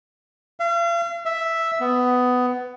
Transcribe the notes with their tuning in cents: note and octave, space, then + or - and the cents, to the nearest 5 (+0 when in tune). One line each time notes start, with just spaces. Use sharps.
F5 -40
E5 +0
B3 +15